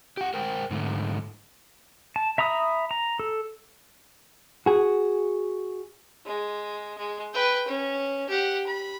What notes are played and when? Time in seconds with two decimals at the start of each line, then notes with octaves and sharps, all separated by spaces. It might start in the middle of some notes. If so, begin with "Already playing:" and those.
0.17 G4 F#5
0.34 A#4 C5 G5
0.71 G#2 D3 A3
2.16 A5
2.38 E5 A#5 B5 D#6
2.91 A#5
3.19 A4
4.66 F#4 G#4
6.25 G#3
6.98 G#3
7.34 B4 G5
7.68 C#4
8.29 G4 F#5
8.67 B5